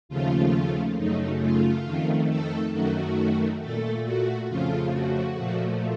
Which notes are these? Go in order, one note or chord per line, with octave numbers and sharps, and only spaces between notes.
D#2 C#3 F3 A3 F4
F#2 C#3 A3 D#4
F4
F2 D#3 A3
A4
F#2 D#3 A3 F#4
A#2 A3 A4
F#4
F2 C#3 F3 A3 F4
F#4
A#2 F3 A3